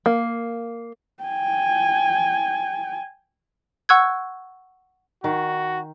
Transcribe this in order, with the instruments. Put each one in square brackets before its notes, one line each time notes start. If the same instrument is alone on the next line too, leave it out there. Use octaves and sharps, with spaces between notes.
[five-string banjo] A#3
[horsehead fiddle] G5 G#5
[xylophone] F#5 C#6 E6 F#6 G#6
[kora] D#3 [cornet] F#4